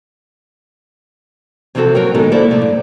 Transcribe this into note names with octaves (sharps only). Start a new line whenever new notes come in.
C3 E3 F3 C4 F#4 A4
F#3 C4 A#4 C#5
D#3 G#3 B3 D#4 F#4 A4
A#3 E4 A4 C5 D5
C3 F3 A3
G2